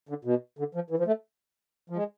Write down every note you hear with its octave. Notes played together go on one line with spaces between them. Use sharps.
D3
B2
D3
F3
E3
F3
A3
F3
G#3